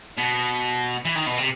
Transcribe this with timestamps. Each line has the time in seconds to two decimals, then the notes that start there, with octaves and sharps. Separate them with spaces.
0.17 B2
1.05 E3
1.15 D#3
1.26 B2
1.38 C3